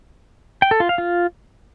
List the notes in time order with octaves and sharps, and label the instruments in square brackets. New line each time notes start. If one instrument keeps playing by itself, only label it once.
[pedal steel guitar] G5
A4
F4
F5
F4